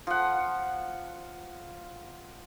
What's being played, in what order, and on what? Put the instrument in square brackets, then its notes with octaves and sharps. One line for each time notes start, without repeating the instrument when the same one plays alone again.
[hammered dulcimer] F3 F#5